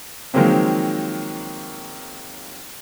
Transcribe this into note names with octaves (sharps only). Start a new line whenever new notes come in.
D#3 F3 F#3 G#3 A#3 C4